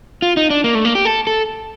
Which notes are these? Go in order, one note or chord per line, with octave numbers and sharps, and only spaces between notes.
F4
D#4
D4
A#3
A3
A#3
G4
A4
A4